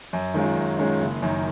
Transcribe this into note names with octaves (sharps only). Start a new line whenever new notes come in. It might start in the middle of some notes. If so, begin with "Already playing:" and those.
F#2
D#3 G#3 C#4 F4
F#2
D#3 G#3 C#4 F4
F#1
F#2 D#3